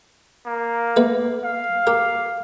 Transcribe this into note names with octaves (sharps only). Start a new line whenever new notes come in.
A#3
A3 B3 B4
F5
G4 A#4